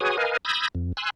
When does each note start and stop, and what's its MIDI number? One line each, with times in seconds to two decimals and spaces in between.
0.01 0.17 66
0.01 0.17 68
0.01 0.17 71
0.01 0.17 73
0.01 0.17 80
0.01 0.17 87
0.17 0.37 70
0.17 0.37 71
0.17 0.37 75
0.17 0.37 77
0.17 0.37 80
0.45 0.68 83
0.45 0.68 87
0.45 0.68 88
0.45 0.68 91
0.45 0.68 92
0.45 0.68 94
0.75 0.92 41
0.97 1.10 80
0.97 1.10 84
0.97 1.10 88
0.97 1.10 90